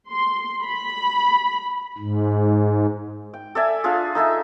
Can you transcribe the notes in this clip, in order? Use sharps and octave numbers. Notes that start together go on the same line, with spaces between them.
C6
B5
G#2
G5
A4 D5 E5 G#5
D4 F4 G#4
D#4 A4 E5 G#5